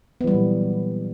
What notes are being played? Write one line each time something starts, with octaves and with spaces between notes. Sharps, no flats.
A#2 E3 F#3 G3 B3